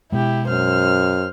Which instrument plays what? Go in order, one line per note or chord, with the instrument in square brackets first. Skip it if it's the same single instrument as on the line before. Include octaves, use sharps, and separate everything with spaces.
[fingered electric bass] B2 G#3 [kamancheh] E4 G4
[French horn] F#2 [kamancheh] C5 F6